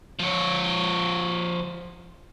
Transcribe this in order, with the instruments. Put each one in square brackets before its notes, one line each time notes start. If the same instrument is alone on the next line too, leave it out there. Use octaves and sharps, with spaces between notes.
[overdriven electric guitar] F3 C#5